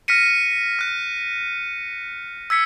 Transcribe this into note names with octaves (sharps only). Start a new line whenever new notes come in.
F6 A#6 B6 C#7 D#7
F6 F#6
E6 G#6 B6 C#7